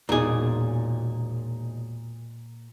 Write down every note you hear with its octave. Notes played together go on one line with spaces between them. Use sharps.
E1 A#2 D#4 G#4